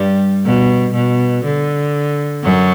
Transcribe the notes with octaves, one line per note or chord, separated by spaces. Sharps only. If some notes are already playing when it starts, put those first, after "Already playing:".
Already playing: G2 G3
B2
B2
D3
F#2 F#3